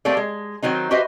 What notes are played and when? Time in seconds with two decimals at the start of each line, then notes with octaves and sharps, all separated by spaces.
0.05 G3 A3 A#3 C4 D5
0.17 G#3
0.63 D#3 F#3 C4 D#4
0.91 F#4 G4 B4 C5 D#5 E5